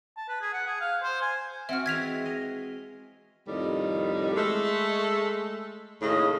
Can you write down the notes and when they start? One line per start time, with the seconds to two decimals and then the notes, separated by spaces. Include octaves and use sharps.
0.17 A5
0.29 B4
0.41 G#4
0.53 F#5
0.67 G#4
0.81 F5
1.02 C5
1.22 G#5
1.69 C4 F#4 E5 F#5 F6
1.86 E3 G#3 G#6 B6 F7
2.26 D#5
3.47 F2 A2 D#3 G3
4.36 G#3 A3
6.02 D#2 A2 C#3 D#5